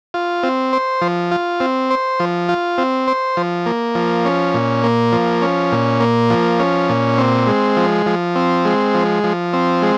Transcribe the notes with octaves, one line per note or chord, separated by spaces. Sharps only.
F4
C4
C5
F3
F4
C4
C5
F3
F4
C4
C5
F3
A#3
F3
C#4
A#2
A#3
F3
C#4
A#2
A#3
F3
C#4
A#2
C4
G#3
F3
F3
C4
G#3
F3
F3
C4
G#3